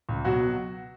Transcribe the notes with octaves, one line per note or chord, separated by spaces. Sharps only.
C#2
B2 F#3 F#4